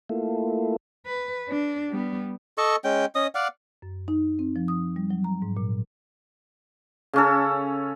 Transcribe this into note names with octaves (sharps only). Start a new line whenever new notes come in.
A3 A#3 E4 F4 A4
B4
D4
G3 B3
A4 D#5 A5 C#6
G#3 C#4 G5
C#4 D#5 D#6
D5 F5 F#5
F#2
D#4
C4
F3
D#6
G3
F#3
A#5
G#2
A#2
C#3 C#4 A4